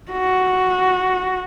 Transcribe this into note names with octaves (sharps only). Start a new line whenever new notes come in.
F#4